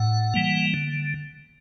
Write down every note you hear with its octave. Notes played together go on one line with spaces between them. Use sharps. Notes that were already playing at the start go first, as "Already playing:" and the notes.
Already playing: A2 F#5
E3 G3 A#3
D3